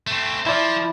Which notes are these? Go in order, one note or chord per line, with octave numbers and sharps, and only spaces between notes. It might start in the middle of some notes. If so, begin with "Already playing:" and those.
A3 C4
F3 E4 D5